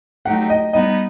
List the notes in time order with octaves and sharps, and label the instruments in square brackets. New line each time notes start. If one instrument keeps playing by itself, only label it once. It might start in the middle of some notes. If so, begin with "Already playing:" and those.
[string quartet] F#3 A3 D#4 G4 [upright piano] F#5
[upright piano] D#5
[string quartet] G3 B3 D#4 [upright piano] D#5